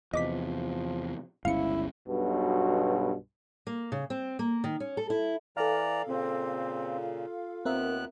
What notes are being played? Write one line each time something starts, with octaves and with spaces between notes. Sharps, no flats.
E2 C3 F3 D#5 D6 B6
G1 C#2 C#3 E4 F5 C#7
B1 G2 B2
A#3
C#3
C4
A#3
D#3
C#4
A4
E4
E3 A4 D5 F5 A#5
A#2 C#3 C4
F4
D#2 B3 C4 A#4 E5 F#6